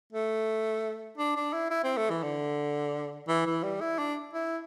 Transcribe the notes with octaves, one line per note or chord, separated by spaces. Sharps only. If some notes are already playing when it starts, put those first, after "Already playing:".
A3
D4
D4
E4
E4
C4
A3
E3
D3
E3
E3
G3
E4
D4
E4